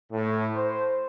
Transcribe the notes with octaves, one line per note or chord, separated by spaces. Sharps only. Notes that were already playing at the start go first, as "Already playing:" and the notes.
A2
C5